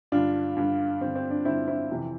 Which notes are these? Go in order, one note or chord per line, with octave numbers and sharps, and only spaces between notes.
G2 D3 D4 F4
G2 D3
G2 D3 C4
C4
D4
G2 D3 C4 E4
C4 E4
F2 C3 E3